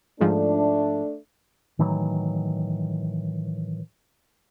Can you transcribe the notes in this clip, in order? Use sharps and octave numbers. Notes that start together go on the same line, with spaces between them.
G#2 F3 A3 D4
A2 D#3 E3 F#3